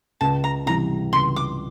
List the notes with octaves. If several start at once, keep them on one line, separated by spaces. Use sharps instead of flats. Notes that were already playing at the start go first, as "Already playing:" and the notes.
C#2 A5
A#5
C3 E3 G3 A#5
C#2 C6
D6